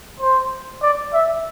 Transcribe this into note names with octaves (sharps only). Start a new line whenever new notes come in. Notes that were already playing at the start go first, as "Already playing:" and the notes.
C5
D5
E5